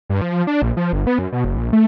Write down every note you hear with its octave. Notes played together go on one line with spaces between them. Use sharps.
G2
F3
D4
A#1
F3
G1
B3
F#2
B2
F#1
A#1
A3